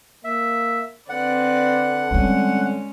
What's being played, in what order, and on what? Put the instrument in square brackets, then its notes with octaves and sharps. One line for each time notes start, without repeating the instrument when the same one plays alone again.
[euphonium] A#3 [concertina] E5
[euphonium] D3 [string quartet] C4 B4 D5 [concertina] F#5
[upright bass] G3 C4 [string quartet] G#3 C#4